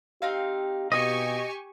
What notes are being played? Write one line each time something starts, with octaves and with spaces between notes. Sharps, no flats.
C4 D#4 G4 F5
B2 G4 D#5 G#5 C#6